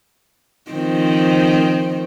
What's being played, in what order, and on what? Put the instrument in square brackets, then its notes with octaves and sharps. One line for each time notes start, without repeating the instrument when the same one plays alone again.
[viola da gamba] D#3 F3 C4